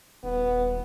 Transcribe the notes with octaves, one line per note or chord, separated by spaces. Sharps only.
D#1 B3